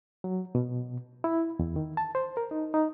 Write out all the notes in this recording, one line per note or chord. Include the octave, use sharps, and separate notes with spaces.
F#3
B2
E4
E2
D#3
A5
C5
A#4
D#4
D#4